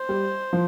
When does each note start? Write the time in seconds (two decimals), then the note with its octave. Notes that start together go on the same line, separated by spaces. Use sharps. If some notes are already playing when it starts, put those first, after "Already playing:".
Already playing: C5
0.09 G3
0.53 F3